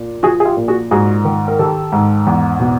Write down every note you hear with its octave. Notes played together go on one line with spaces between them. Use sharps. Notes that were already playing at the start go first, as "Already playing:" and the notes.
Already playing: A#2
F3 F#4 G#4
G#4
F4 G4
A#2
F#4 G#4
G#2 F#4 G#4
D#3
A#4
D#3 G4 A4
G#2
E2
B2